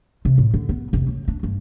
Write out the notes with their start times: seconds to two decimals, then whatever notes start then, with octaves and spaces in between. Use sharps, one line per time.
0.25 C3
0.38 A2
0.54 D3
0.69 B3
0.93 F1
1.08 C#3
1.28 D4
1.43 G2